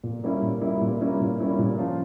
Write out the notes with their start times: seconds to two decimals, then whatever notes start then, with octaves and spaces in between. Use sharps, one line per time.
0.04 A#2
0.24 G3 A#3 C#4 E4
0.42 A#2
0.61 G3 A#3 C#4 E4
0.81 A#2
1.01 G3 A#3 C#4 E4
1.21 A#2
1.40 G3 A#3 C#4 E4
1.59 A#2
1.79 F3 C#4 F4